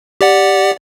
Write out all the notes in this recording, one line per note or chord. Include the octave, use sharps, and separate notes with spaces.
G4 D5 F#5